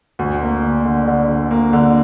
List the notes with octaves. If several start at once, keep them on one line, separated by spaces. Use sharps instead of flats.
D2
A#3
D3
D3
D3
D3
A#3
D3